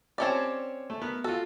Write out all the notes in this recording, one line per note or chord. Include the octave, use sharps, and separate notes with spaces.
C4 C#4 G4 C#5 D5 A5
A3
B3 A#4
F4 F#4 A4